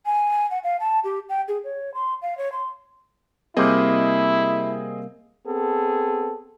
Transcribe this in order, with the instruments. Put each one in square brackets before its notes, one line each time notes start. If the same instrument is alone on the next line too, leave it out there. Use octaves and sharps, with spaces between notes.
[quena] G#5
F#5
F5
A5
G4
G5
G#4
C#5
C6
F5
C#5
C6
[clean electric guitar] C3 G3 A#3 [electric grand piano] C4 G#4 D#5 [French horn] E4
[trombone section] B3 C4 G#4 A4